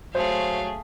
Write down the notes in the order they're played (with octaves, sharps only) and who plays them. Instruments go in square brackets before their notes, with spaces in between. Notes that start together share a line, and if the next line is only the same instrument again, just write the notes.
[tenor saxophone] F#3 [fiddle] A3 G#4 [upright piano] C5 [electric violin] F5